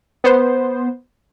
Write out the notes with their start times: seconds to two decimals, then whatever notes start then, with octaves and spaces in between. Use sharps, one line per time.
0.24 B3 C5